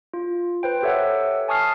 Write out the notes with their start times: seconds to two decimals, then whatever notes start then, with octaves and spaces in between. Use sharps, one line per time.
0.14 F4
0.63 B4 C5 G5
0.82 G4 A4 C#5 E5 F#5
1.48 G#5 A5 C#6 D#6 F6 C7